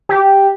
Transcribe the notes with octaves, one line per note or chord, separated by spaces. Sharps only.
G4